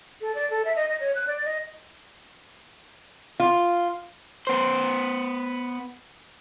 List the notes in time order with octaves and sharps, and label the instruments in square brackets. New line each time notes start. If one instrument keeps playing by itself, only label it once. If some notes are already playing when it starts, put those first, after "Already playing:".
[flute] A4
D5
A4
E5
D#5
D#5
C#5
F#6
D5
D#5
[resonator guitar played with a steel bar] F4
[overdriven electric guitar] B3 C5